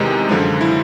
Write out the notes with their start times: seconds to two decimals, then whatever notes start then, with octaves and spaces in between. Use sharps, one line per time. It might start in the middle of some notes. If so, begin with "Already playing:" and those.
Already playing: E2 C3 D#3 G#3 D#4
0.29 F#2 D3 F3 G#3
0.61 E4